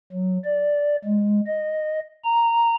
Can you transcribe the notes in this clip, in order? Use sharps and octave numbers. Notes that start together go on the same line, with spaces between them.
F#3
D5
G#3
D#5
A#5